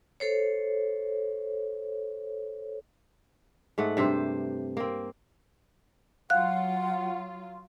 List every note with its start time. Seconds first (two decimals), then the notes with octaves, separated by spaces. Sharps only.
0.20 A4 C5 C#5
3.78 G#2 A3 F#5
3.97 G2 C3 G4 C5
4.77 A#3 C4
6.30 F#3 F4 F5 F#5 F#6